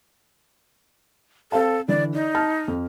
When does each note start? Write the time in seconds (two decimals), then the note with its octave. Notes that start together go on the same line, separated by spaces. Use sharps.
1.52 C4 A4 F5 A5
1.88 D3 E3 D5
2.14 D#4 D5
2.35 A5 F6
2.68 F2